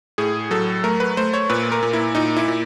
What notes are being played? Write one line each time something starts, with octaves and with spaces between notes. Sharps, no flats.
A2 G#4
F#3 A4
A3 A#4
B4
A3 C5
C#5
A#2 B4
A#4
A#2
E4
A#2 D#4
E4
A#2